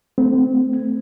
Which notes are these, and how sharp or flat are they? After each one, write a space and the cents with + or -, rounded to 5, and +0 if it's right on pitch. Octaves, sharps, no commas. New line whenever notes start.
A3 +0 C4 -25